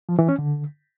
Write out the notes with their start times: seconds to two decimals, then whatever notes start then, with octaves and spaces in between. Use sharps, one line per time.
0.09 F3
0.19 E3
0.29 C#4
0.39 D3